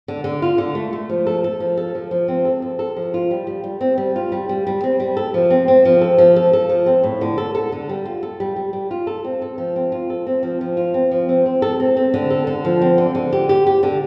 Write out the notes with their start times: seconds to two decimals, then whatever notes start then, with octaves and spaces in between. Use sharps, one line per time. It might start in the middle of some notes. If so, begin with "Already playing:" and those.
0.08 D3
0.24 D3
0.42 F4
0.58 D3
0.75 A3
0.93 A3
1.09 F3
1.27 A4
1.44 A4
1.60 F3
1.77 A4
1.95 F3
2.11 F3
2.28 C4
2.45 A4
2.62 A4
2.79 A4
2.96 F3
3.14 F4
3.31 G3
3.47 G3
3.64 G3
3.81 C4
3.98 G3
4.16 F4
4.32 G3
4.49 G3
4.67 G3
4.84 C4
5.00 G3
5.17 A4
5.34 F3
5.50 C4
5.68 C4
5.85 F3
6.01 A4
6.18 F3
6.36 A4
6.53 A4
6.69 F3
6.86 C4
7.03 A2
7.21 D3
7.38 A4
7.55 A4
7.72 D3
7.89 G3
8.05 F4
8.23 A4
8.40 G3
8.56 G3
8.73 G3
8.91 F4
9.07 A4
9.24 C4
9.42 A4
9.58 F3
9.76 C4
9.92 F4
10.10 A4
10.27 C4
10.43 F3
10.61 F3
10.77 F4
10.94 C4
11.11 F3
11.29 C4
11.46 C4
11.62 A4
11.80 C4
11.97 C4
12.14 D3
12.30 A4
12.47 D3
12.65 F3
12.82 C4
12.98 D3
13.15 D3
13.33 G4
13.49 G4
13.66 G4
13.83 D3